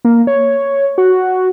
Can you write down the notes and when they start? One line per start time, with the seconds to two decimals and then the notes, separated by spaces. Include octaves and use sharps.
0.05 A#3
0.27 C#5
0.98 F#4